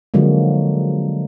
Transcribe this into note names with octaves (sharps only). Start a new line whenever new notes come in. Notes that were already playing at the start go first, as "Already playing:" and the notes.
D3 F3 F#3 G#3 A#3